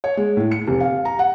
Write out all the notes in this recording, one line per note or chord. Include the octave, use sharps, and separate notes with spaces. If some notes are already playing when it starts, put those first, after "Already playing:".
C#5
G#3
A2
C#7
F1
F5
A#5
F#5